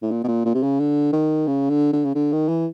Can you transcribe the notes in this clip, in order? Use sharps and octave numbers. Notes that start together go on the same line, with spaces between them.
A2
A#2
B2
A#2
A#2
C3
C#3
D3
D#3
C#3
D3
D3
C#3
D3
D#3
E3